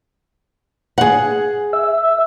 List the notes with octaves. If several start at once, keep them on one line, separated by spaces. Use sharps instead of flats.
G#4 F#5
E5